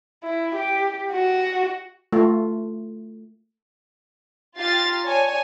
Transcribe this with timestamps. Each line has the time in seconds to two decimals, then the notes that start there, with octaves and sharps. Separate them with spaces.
0.24 E4
0.56 G4
1.12 F#4
2.13 A3 F4
4.56 F4 G4 F5 A#5 A6
5.03 C#5 D5 G#5 A5